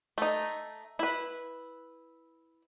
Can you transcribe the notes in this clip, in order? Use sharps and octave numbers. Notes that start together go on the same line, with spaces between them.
A3 D#4
E4 B4